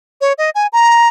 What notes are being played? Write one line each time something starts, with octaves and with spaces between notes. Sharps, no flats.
C#5
D#5
G#5
A#5